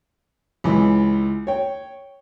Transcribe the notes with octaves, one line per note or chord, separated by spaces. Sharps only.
C#2 E3
C#5 G5